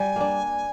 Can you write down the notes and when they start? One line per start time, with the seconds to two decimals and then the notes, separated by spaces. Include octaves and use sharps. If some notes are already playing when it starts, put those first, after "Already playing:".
Already playing: G3 G#5
0.16 A#3 D4